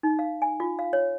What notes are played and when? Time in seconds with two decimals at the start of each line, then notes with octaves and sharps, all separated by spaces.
0.03 D#4
0.19 F5
0.42 G#5
0.60 F4
0.79 F5
0.93 C#5